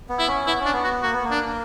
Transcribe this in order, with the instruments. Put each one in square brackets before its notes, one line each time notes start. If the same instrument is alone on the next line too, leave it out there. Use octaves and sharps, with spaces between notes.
[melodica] B3
[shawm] E4
[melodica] C#4
[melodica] B3 [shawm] E4
[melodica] C#4 [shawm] D4
[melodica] B3
[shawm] F#4
[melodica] A#3 [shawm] F#4
[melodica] B3
A#3
[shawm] D4